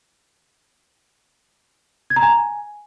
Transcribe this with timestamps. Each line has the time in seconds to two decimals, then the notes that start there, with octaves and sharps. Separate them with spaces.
2.10 G#6
2.16 A#5
2.22 G#5